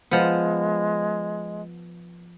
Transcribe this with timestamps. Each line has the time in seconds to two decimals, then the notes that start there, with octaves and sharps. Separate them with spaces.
0.11 F3 G#3 B3